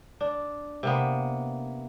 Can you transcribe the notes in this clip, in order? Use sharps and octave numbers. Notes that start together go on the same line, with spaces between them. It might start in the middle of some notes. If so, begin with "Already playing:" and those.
D4
C3 A#3 B3